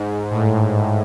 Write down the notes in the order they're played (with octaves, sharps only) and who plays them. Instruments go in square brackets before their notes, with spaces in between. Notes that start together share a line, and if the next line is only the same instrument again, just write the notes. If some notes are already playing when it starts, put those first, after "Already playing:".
Already playing: [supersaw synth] G#2
A2